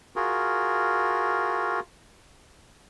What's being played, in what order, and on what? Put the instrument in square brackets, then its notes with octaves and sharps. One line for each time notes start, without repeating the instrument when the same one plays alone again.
[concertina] F4 F#4 G#4 A#4